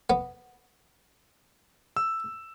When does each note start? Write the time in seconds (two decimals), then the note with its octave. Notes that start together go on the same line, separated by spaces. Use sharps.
0.10 B3
1.96 E6